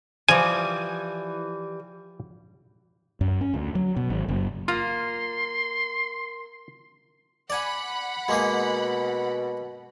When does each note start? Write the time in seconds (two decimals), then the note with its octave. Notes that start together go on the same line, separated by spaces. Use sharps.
0.28 E3 F3 G3 G#5
3.21 F#2
3.41 C#4
3.54 D2
3.75 F#3
3.96 B2
4.10 G#1
4.28 F#1
4.68 A#3 F4 C6
7.50 D5 F#5 G#5 B5
8.28 B2 G#3 A#3 G#4